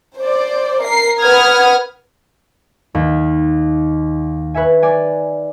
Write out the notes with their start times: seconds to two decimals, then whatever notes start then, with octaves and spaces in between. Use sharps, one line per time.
0.19 C5 D5
0.84 A#4 C7
1.21 B4 F#5 D#6 F6 G#6
2.95 D#2
4.54 B4 C#5 E5 G#5
4.82 D5 G#5